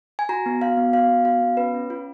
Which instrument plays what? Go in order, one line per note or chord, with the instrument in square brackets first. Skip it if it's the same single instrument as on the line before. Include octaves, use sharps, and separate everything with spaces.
[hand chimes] G#5
F#4 A#5
B3
F#4 F5
B3
F#4 F5
B3
F#4 F5
B3
C#4 B4
C#4
F4